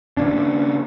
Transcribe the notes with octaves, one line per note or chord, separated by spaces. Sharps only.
C#3 A#3 D4